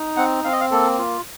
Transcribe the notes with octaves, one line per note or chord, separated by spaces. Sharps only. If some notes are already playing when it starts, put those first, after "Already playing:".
Already playing: D#4
C4 F#5
C4 F5
D#5
F5
A#3 A4
F4